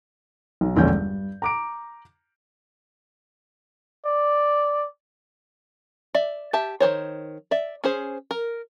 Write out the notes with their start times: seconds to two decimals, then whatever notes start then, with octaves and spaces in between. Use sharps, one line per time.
0.61 B1
0.76 E1 A#1 D3 C#4 G6
0.92 G2
1.42 A#5 D6 D7
4.06 D5
6.15 D5 E5
6.53 G4 E5 A5
6.80 D#3 A4 C5 C#5
7.51 D5 E5
7.84 C#4 G#4 C5
8.31 A#4